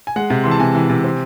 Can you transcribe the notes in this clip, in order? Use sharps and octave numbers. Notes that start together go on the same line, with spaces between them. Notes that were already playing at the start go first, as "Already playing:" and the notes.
G#5
G#3 F#5
C3
E3 C6
A5
C3 G#5
E3
C3
C4